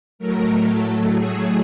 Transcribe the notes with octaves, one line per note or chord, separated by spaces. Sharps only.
A2 F#3 A3 A#4
A4
G#4